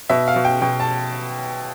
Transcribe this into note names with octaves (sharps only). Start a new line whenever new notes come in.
B2 E5
F5
B2
G5
B2 G5
A5